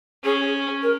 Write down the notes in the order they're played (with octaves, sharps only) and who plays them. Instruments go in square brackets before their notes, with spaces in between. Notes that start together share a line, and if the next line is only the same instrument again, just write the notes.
[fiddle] C#4 [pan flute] G#4
[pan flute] A#4